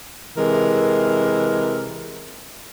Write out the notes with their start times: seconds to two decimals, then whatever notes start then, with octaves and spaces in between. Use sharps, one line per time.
0.37 C3 E3 G#3 A#4